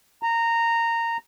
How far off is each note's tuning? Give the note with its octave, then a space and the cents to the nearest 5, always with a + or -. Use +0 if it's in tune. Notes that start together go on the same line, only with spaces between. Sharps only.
A#5 -15